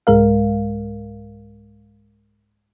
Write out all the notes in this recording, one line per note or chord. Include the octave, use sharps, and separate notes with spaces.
C2 G#2 G#3 A#4 F5